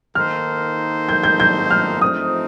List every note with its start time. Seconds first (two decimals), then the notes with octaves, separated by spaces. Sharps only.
0.15 D#3 A#3 D#4 A4 C5 F6
1.09 G6
1.23 G6
1.40 G6
1.70 F6
2.01 F3 A3 C4 D#4 D#6